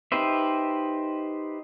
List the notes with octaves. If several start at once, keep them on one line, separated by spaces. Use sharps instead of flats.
D#4 G4 B4 C5 E5